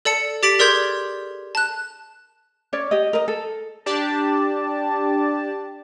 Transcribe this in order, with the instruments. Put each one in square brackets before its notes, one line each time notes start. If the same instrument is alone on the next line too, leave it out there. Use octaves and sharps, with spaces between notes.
[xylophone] A4 D5 A5 C#7
G4 D6 A6 B6 D7 F#7
G#4 A#4 D5 C6 G6 G#6
A5 F#6
[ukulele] C#4 C#5 D5
G4 D#5
A#4 D#5
A4
[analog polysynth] D4 G4 D5 A5